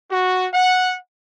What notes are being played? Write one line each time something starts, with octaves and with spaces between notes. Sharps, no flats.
F#4
F#5